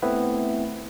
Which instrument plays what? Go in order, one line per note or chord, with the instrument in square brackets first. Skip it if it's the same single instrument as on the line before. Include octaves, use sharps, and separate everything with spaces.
[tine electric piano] A3 B3 C4 E4 B4